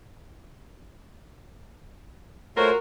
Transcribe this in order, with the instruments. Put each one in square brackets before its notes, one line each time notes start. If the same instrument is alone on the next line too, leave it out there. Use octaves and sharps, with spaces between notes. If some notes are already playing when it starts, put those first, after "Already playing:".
[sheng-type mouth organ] A3 C5 C#5 [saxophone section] F4 F#4 A#4